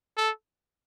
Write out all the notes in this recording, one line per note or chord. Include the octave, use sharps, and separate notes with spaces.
A4